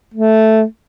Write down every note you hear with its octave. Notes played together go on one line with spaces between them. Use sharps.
A3